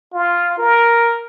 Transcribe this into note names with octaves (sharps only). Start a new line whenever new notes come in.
F4
A#4